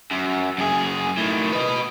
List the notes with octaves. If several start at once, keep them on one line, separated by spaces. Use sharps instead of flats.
F#2
F#2 G#4
A2 D#3
B4 D#5